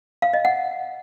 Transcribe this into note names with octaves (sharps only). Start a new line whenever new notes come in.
F5
D#5
F#5